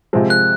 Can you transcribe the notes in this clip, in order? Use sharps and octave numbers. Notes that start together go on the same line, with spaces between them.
C3 F3 G#3 C4
F#6